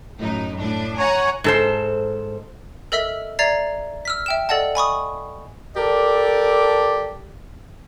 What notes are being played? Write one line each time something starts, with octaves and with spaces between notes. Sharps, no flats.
F#2 A2 D#4
A2 D4
C#5 F#5 G#5 A#5
G#2 A4 C5
A4 A#4 D#5 E5 E6 B6
D5 E5 A#5 G#6 A6 C7
E6 F6 B6
E5 G5 E7
A4 D5 D#5 F#5 A5
G#5 B5 C#6 D#6
G4 A4 A#4 D5